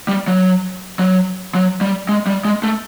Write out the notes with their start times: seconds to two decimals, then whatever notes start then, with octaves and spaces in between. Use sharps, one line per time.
0.08 G3
0.28 F#3
0.99 F#3
1.55 F#3
1.81 G3
2.09 G#3
2.26 G3
2.45 G#3
2.63 A3